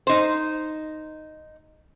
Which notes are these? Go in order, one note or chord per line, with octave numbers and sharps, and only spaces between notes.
D#4 C5